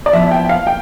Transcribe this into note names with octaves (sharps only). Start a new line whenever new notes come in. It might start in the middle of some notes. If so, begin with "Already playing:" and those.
D5
F3 B3 E4 E5
G5
F5
G5